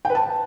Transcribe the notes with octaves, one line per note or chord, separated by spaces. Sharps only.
G5
B4
A5